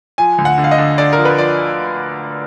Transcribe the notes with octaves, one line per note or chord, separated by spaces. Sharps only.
F3 G#5
D2
F#5
D3
F5
D#5
D3
D3 D5
F3 A#4
B4
F3 D5